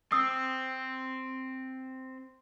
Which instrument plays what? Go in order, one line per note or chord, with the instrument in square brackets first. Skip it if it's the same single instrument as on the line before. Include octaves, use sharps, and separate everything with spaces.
[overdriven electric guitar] C4 [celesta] D#6 E6